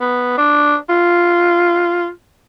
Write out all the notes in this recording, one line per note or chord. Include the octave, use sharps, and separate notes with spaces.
B3
D4
F4